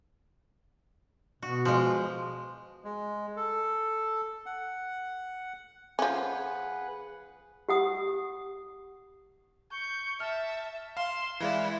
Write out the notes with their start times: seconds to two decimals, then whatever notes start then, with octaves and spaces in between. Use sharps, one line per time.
1.42 B2 F#4
1.65 F3 G#3
2.84 G#3
3.36 A4
4.46 F#5
5.99 F3 C#4 G#4 B4 F#5
7.69 G4 F#5 D#6
9.71 C#6 G6
10.20 E5 A5 F6
10.97 F5 C6 E7
11.40 E3 G#3 E4 D5 F5